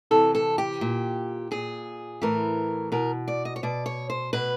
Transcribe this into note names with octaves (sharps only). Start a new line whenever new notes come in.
C3 E3 A4
A4
G4
A#2
A#2 G#4
A2 E3 A#4
B2 A#4
D5
D#5
C#5
B2 D5
C#5
C5
B2 B4